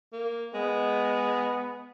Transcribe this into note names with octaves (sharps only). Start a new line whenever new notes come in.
A#3
G#3 B3